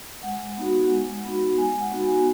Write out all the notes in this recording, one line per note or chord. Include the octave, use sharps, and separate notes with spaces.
G#3 F#5
B3 D#4 F#4
G#3
B3 D#4 F#4
G#3 G#5
F#5
B3 D#4 F#4
G#5